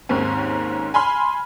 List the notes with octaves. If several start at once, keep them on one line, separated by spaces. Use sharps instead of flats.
D#2 G#2 D#3 C4 C#4
G#5 B5 C6 F6